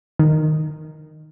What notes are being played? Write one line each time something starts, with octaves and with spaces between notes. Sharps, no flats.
D#3